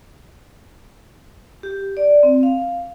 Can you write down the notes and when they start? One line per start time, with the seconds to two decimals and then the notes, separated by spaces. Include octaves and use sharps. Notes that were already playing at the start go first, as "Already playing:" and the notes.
1.63 G4
1.97 D5
2.23 C4
2.43 F5